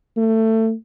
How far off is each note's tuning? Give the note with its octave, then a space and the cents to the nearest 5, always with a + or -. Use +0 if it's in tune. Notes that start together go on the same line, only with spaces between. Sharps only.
A3 +20